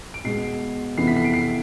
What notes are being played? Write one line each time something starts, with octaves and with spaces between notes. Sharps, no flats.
D7
B2 G#3 B3 C7
F2 C3 E3 B3 C7
B6
C7
D7
C7